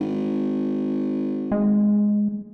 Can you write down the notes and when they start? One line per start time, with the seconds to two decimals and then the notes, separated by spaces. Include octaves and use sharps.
0.01 G#1
1.52 G#3